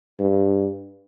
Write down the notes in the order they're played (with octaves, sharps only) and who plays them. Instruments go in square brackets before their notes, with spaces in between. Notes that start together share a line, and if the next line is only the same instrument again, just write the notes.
[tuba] G2